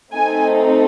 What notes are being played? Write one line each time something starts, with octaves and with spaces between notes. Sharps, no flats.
A3 C4 D#4 A4 G#5